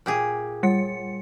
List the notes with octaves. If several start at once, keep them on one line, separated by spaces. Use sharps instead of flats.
A#2 G4 G#4
G3 C#7